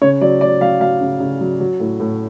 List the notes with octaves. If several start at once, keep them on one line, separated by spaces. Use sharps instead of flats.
C#3 C#5
F#3 D5
F#3 D5
F#3 F5
F#3 F5
C#3
C#3
F#3
F#3
A2
A2